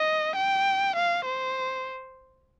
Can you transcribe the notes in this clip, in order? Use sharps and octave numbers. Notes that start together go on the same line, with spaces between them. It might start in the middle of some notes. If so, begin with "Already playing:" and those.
Already playing: D#5
G5
F5
C5